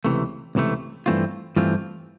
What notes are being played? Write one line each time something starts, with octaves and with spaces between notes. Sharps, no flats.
C#2 C3 E3 A3
C#2 C3 E3 A3
G2 E3 A3 C4 F4
G2 E3 A3 C4 F4